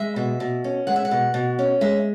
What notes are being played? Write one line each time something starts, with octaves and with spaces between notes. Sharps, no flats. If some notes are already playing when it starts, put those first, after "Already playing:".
Already playing: G#3 E5
B2
B2
C#4
G#3 F#5
E5
F#5
B2
B2
C#4
G#3 E5